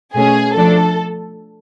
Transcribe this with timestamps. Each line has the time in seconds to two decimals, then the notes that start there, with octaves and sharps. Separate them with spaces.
0.15 B2 A3 C#4 G#4
0.55 F3 A3 D4 A4